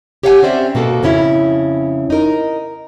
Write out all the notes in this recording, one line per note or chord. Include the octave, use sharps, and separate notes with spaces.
G4 C#5 D#5 F5 F#5 G#5
C4 C#4 C5 D5 E5
B2 A#3 F#4 A4
F2 C#3 C#4 E4
D#4 A#4